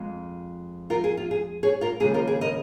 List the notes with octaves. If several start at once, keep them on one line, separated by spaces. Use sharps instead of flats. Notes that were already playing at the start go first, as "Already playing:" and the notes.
Already playing: F2 F3 G#3
F4 A#4
G#4
F4
G#4
G#4 C#5
F4 A#4
D#2 C#3 F3 G#3 C#4 G#4
F4 A#4
G#4
A#4 D#5